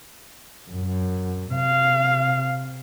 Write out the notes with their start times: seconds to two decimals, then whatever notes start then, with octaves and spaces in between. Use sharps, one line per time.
0.70 F#2
1.55 C3 F5